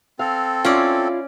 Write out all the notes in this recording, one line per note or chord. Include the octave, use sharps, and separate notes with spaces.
C4 A4 F5
C#4 E4 F4 D5